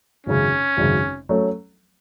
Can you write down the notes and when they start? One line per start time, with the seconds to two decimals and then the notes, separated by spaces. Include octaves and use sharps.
0.26 G#1 F#2 C#3 C#4
0.77 G#1 F#2 C#3
1.29 F#3 A3 C#4